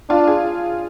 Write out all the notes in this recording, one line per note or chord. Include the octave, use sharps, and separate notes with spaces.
D4 F4
G#4